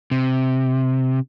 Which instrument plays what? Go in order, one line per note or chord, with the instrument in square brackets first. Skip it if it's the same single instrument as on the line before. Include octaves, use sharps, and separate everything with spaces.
[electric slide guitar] C3